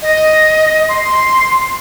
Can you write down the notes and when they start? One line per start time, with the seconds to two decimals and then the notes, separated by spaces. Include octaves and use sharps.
0.02 D#5
0.88 C6